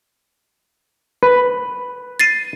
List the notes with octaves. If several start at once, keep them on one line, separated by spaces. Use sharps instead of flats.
B4
A6 C7 D#7